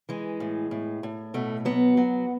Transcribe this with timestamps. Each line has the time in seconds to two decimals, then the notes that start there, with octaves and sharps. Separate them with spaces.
0.09 E3 G#3
0.40 A2
0.71 A2
1.03 A2
1.34 B2 A3
1.65 F#3 B3
1.97 F#3